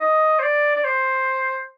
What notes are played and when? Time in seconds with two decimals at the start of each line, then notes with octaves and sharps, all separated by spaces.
0.01 D#5
0.39 C5
0.43 D5
0.75 D5
0.84 C5